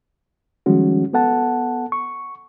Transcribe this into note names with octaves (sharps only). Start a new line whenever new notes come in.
D#3 F3 G3 G#3 C#4 F#4
B3 A4 F#5 A5
C#6